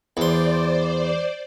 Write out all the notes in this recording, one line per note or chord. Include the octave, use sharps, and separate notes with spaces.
E2 C5 D5 C6